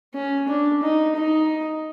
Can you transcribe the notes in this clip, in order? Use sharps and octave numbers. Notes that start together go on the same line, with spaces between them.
C#4
D4
D#4
D#4